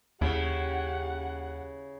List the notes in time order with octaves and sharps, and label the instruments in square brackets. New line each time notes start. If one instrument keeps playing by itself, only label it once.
[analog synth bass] D#2 [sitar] C#3 E4 [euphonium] G4 [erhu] F#5